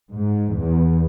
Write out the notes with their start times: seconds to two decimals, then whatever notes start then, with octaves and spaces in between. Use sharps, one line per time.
0.12 G#2
0.58 E2